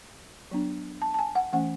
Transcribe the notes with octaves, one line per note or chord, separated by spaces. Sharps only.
F#3 B3 D4
A5
A5
G#5
F#5
E3 A3 C#4 F#5